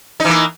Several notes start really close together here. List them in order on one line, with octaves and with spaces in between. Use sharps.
D#4 E3 A#3